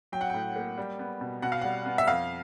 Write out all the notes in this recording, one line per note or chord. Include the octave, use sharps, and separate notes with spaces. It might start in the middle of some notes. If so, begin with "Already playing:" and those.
F#3 G5
F#5
A2 G5
A#3
G3
B3
B2
B2 F#5
F5
G3 F#5
B3
E5
F2 F5